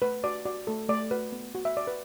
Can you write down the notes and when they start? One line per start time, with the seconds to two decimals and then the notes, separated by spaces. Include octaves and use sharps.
0.02 A3 B4
0.24 F#4 D5
0.45 F#4 D5
0.67 A3 A4
0.89 A3 D5
1.11 F#4 B4
1.32 B3
1.55 F#4
1.65 E5
1.77 F#4 D5
1.87 B4